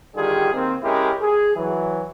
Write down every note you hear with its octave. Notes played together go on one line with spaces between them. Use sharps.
D3 D#3 G3 F4 G4 G#4
D#3 A#3 C4
G#3 C#4 E4 G4 A#4
G#4
E3 F#3